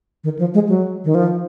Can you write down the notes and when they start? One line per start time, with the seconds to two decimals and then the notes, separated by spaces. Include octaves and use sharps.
0.24 D#3
0.39 F3
0.54 G#3
0.69 F#3
1.05 D#3
1.15 F3